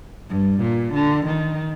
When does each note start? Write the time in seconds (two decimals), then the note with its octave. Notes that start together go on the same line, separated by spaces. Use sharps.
0.30 G2
0.62 A#2
0.95 D3
1.27 D#3